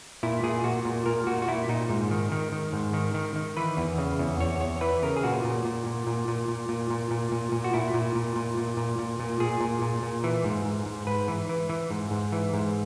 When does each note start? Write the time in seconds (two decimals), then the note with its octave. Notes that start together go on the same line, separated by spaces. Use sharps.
0.23 A#2 E4
0.44 A#2 G#4
0.64 A#2 F#4
0.85 A#2
1.06 A#2 A#4
1.27 A#2 F#4
1.42 F#4
1.48 A#2 E4
1.69 A#2 D#4
1.90 G#2
2.11 D#3
2.32 D#3
2.52 D#3
2.73 G#2
2.93 D#3
3.14 D#3
3.36 D#3
3.57 E3 B4
3.77 E2
3.98 C#3
4.19 E2
4.40 E2 C#5
4.61 E2 C#5
4.81 E3 B4
5.03 C#3 A#4
5.17 G#4
5.23 A#2 F#4
5.44 A#2
5.65 A#2
5.86 A#2
6.07 A#2
6.28 A#2
6.48 A#2
6.69 A#2
6.90 A#2
7.11 A#2
7.32 A#2
7.52 A#2
7.64 F#4
7.74 A#2 E4
7.94 A#2
8.15 A#2
8.36 A#2
8.58 A#2
8.77 A#2
8.99 A#2
9.20 A#2
9.40 A#2 G#4
9.61 A#2
9.82 A#2
10.03 A#2
10.24 E3
10.44 G#2
10.65 G#2
10.86 G#2
11.07 G#2 B4
11.28 E3
11.49 E3
11.70 E3
11.91 G#2
12.11 G#2
12.32 E3
12.54 G#2